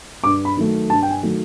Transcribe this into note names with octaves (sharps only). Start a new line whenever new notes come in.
G2 D6
B5
D#3 F#3 A3
G2 A5
G5
G#5
D#3 F#3 A3